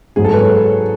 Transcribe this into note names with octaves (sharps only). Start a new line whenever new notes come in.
G#2 F#3 G#4
A4
B4
C#5